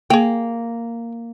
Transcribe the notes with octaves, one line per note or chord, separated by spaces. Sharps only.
A#3 G#4 G5